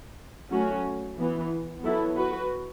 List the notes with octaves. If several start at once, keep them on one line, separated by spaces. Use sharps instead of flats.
F#3 A3 C#4 F#4
E3 B3
F#3 B3 E4 A4
F#4 B4